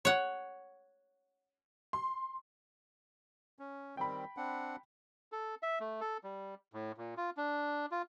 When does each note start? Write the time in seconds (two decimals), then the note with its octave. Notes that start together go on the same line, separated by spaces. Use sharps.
0.05 C#5 F#5
1.93 C6
3.59 C#4
3.97 D#3 G3 C4 G5 B5
4.37 C4 D4 F#5
5.32 A4
5.63 E5
5.80 A3
6.01 A4
6.24 G3
6.73 A2
6.97 A#2
7.17 F4
7.37 D4
7.91 F4